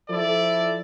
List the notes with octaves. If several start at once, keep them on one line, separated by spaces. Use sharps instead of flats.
F3 E4 A4 D5